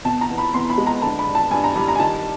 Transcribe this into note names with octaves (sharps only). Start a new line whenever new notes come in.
B2 A5
A#5
E2
B5
E2 C6
B5
G#3
A#5
D3 A5
B5
G2
A5
G2 G#5
A#5
G3 B5
A#5
G#5
D#3 A5